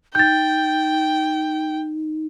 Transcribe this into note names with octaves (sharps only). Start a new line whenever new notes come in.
D#4 G5 G6 A6